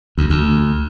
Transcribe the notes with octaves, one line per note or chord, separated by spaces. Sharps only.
D2
D2